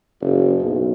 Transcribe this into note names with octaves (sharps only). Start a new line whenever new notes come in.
F#1
B1